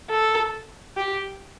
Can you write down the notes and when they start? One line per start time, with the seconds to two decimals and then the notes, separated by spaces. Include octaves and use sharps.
0.10 A4
0.97 G4